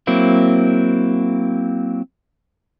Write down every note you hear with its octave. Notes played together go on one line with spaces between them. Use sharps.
F#3 A#3 C4 E4